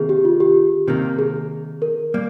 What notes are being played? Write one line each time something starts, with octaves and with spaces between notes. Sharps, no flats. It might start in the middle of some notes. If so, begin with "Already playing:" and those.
Already playing: C3 D#3 A#3 G#4
G4
F4
G4
C3 D#3 A#3
G#4
A#4
G3 A#3